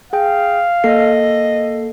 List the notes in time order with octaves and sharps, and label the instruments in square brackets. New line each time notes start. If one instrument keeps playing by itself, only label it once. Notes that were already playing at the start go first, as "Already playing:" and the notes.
[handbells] G#4 G5 [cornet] F5
[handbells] A#3 A4 C7 [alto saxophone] D#5